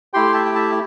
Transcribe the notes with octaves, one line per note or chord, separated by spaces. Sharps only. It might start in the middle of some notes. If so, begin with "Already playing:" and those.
A3 E4 G4 G5 C6
E5 A5
G5
E5 A5